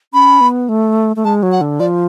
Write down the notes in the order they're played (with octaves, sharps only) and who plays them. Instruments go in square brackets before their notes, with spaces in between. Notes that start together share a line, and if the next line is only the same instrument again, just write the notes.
[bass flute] C#4 [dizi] B5
[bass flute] B3
A3
A3
[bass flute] G#3 [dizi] A5
[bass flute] F#3
[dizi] F#5
[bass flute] D3
[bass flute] F3 [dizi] D5